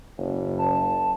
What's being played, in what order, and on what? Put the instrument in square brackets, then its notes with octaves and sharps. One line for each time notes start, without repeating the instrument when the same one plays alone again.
[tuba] F#1
[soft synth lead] A5